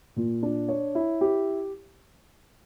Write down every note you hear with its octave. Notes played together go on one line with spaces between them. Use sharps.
A#2
D4
C#5
E4
G4